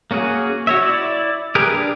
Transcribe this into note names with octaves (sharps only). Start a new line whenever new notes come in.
A#3 C#4 F#4 G#4
F#4 C#5 E5
E4 D5
G4 G#4 A#4 B4
D4 G4